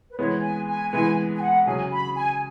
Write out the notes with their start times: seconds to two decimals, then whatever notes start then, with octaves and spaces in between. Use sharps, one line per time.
0.11 B4
0.18 E3 G#3 B3 C#5
0.43 G#5
0.68 G#5
0.92 E3 G#3 B3 G#5
1.36 G#5
1.41 F#5
1.66 C#3 F#3 C#4 G#4 G#5
1.91 B5
2.15 G#5